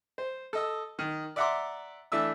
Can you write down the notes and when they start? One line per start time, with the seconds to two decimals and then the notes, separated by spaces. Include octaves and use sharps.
0.18 C5
0.53 A4 D#5 E6
0.99 D#3
1.36 D5 E5 F#5 A#5 C6 D6
2.12 E3 A3 D4 E5 E6